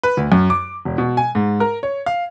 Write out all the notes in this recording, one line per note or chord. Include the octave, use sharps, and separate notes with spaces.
B4
D2
F#2
D6
E1
B2
G#5
G#2
A#4
C#5
F5